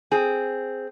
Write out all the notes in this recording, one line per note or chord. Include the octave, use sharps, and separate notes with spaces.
C4 G#4